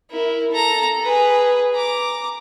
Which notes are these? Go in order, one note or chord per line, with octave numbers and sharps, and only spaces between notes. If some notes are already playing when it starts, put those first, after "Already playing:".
E4 A#4
A4 A#5
G#4 B4
A#5 D6